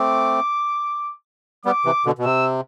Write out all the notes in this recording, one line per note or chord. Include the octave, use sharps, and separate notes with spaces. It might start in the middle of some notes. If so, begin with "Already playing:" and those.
Already playing: A3 C4 D6
G3 B3 D6
C3 E3
B2 D3
B2
C3 E6